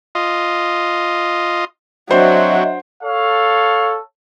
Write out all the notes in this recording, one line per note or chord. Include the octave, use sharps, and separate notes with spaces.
F4 D#5
F#3 C4 D4 F#4 C5 D#5 E5
A4 C#5 F5